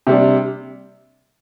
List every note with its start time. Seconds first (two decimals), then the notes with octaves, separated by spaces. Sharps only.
0.07 C3 G3 D4